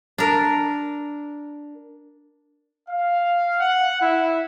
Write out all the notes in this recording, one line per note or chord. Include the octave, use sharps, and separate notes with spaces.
D4 A#4
F5
F#5
E4